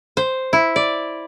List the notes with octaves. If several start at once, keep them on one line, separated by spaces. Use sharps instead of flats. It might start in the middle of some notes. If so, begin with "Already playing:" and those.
C5
E4
D5